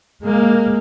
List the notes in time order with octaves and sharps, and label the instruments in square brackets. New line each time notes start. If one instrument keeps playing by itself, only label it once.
[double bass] G#3 [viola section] A#3